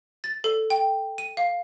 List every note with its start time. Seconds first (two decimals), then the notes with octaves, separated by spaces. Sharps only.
0.24 A6
0.44 A4
0.70 G5
1.18 D#7
1.37 F5